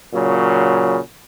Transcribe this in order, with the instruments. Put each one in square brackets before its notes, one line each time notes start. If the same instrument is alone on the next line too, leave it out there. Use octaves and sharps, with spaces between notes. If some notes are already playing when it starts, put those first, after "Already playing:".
[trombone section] A#2 C#3 F#3